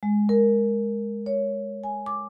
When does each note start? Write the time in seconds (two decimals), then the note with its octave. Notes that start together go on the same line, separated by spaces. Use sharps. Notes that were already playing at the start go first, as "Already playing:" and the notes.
0.03 G#3
0.29 A#4
1.26 C#5
1.84 G#5
2.06 D6